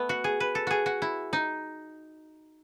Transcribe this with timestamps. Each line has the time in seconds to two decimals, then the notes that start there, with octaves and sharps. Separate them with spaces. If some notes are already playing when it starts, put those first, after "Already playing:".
Already playing: A3 B3
0.09 F#4
0.24 G#4
0.40 B4
0.55 A4
0.67 F#4 G#4
0.86 F#4
1.02 E4
1.33 D#4